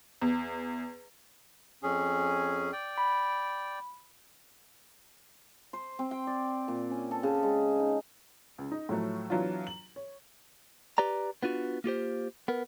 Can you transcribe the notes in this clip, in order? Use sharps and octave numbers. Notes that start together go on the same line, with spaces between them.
E2
F2 C#4 G#4
D5 G5
B5
C5
C4
G5
D5
A#2
C#4
A4
C#3
G#3
D#4
C#2
D#4
A2 F3 F#3 A3
E3 F#3 B3 D4 F4
F#7
C#5
G4 B4 D5 A#5
B3 D4 F4 F#4
A#3 F4 G4 C5
B3 A#4